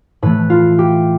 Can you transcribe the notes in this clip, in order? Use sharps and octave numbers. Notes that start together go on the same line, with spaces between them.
A2 E3 A3 B4
F4
G4